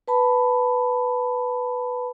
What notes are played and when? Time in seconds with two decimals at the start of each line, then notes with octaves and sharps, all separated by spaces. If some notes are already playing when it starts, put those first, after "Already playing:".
0.08 B4 A5 B5